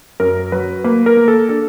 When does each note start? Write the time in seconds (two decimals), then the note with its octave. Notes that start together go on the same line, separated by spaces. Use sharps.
0.20 F#2 A#4
0.52 F#3 B4
0.84 A#3 B4
1.06 A#4
1.17 A#3
1.28 A4
1.49 D4 A4